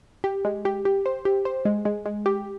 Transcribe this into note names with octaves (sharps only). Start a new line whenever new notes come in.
G4
G#3
G4
G4
C5
G4
C5
G#3
G#3
G#3
G4